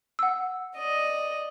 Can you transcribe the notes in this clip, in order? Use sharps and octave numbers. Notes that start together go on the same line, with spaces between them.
F#5 E6
D5 D#5